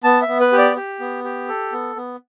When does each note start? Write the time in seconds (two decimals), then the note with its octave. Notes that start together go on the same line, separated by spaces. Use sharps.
0.04 B3 A5
0.22 E5
0.28 B3
0.40 B4
0.52 G4
0.58 D5
0.76 G4
1.00 B3
1.24 G4
1.48 A4
1.73 B3
1.96 B3